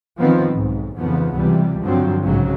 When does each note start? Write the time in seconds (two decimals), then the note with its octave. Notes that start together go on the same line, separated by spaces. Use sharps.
0.17 D#3 F3 B3 C4
0.53 B1 G#2
0.97 F2 G#2 C#3 E3 F3 B3
1.33 C#2 C3 E3 G3
1.81 G2 D3 F3 F#3 C4
2.23 B1 G#2 C#3 F#3